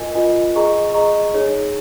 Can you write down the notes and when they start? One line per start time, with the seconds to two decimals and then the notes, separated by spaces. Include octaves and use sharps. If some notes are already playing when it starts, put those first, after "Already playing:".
Already playing: F4 A#4 D#5 G#5
0.15 F4 A#4 D#5 G#5
0.55 G#4 D#5 A#5 C#6
0.94 G#4 D#5 A#5 C#6
1.34 D#4 G#4 C#5